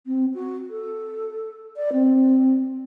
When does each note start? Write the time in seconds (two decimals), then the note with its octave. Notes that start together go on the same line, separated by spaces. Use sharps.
0.07 C4
0.34 F#4
0.70 A4
1.76 D5
1.93 C4